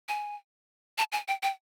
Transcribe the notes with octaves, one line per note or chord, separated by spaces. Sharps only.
G#5
A5
G#5
G5
G5